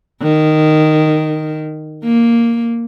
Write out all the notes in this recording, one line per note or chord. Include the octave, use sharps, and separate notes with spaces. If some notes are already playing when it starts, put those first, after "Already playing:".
D#3
A#3